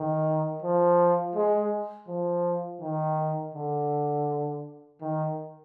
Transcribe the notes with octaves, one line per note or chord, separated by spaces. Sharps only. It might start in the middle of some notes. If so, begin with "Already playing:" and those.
Already playing: D#3
F3
G#3
F3
D#3
D3
D#3